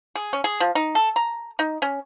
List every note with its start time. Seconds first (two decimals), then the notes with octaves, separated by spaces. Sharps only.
0.15 G#4
0.33 C#4
0.44 G#4
0.60 F3
0.75 D#4
0.95 A4
1.16 A#5
1.59 D#4
1.82 C#4